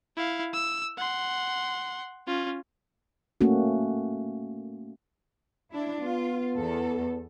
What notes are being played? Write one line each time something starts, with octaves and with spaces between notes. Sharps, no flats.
E4 F5
E6
F#5 C6
C#4 F4
A3 A#3 C#4 F#4
D4 E4
B3 F4
E2 A4